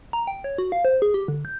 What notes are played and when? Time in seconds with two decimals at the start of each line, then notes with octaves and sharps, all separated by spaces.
0.13 A#5
0.27 G5
0.44 C#5
0.58 F#4
0.72 F5
0.85 C5
1.02 G#4
1.14 G4
1.28 D3
1.45 G6